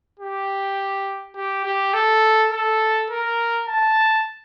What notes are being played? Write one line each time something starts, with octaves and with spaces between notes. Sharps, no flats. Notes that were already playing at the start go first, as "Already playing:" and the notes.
G4
G4
G4
A4
A4
A#4
A5